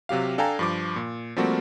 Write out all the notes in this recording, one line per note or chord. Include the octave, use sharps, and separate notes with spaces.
C3 F#3 G4 F5
D4 A4 F5 G5 G#5 A#5
G2 F3 D6
A#2
F3 G3 A3 A#3 C4 F#4